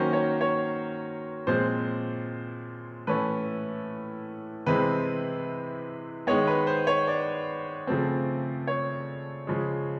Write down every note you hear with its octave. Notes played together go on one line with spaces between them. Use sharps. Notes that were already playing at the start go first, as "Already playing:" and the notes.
Already playing: D#3 F#3 A#3 C#4 C5
C#5
C#5
A#2 F3 G#3 C4 C5
A2 E3 A3 C#4 B4
C3 E3 G#3 C4 B4
D#3 G#3 B3 C#5
B4
C5
C#5
D5
C#3 F3 A3 C4
C#5
C#3 F3 G#3